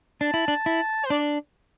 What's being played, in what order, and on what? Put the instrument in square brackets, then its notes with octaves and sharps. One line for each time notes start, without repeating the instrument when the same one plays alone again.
[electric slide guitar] D4 [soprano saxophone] A5
[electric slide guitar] E4
D4
E4
[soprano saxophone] C5
[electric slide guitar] D4 [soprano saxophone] D5